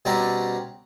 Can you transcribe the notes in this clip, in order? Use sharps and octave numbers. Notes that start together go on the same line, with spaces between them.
B2 G3 C4 C#4 D5 A#5